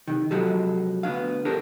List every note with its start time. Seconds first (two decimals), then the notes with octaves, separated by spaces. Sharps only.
0.07 C3 D#3
0.31 C3 F3 F#3 G#3 G4 A4
1.03 D2 B3 D4 F5
1.45 D4 G4 A4 A#4